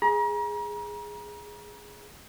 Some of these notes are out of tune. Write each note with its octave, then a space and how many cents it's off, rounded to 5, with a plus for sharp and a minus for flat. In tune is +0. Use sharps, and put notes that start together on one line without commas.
G#4 +0 A#5 +35